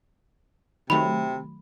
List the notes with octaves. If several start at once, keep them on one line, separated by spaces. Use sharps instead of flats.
C3 D#3 F#3 A3 B5